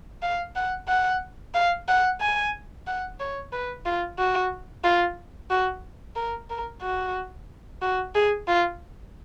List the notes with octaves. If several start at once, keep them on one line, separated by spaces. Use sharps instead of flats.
F5
F#5
F#5
F5
F#5
G#5
F#5
C#5
B4
F4
F#4
F4
F#4
A#4
A#4
F#4
F#4
G#4
F4